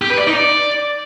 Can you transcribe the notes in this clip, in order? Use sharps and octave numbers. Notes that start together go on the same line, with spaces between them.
G4
B4
D5
D#4
D5